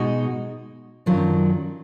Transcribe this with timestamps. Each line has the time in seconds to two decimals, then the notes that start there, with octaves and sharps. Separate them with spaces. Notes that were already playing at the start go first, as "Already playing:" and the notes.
Already playing: B2 G#3 D#4 F#4
1.06 F#2 D#3 F#3 D4 F4